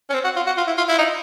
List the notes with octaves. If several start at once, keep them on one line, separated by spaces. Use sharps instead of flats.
C#4
C4
F#4
F4
F#4
F4
E4
F4
E4
D#4